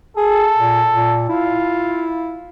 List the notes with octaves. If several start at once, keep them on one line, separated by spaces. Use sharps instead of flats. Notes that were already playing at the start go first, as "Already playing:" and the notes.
G#4 A4
A#2
A#2
E4 F4